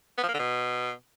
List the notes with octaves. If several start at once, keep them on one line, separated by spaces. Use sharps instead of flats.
B3
F3
A#3
D3
B2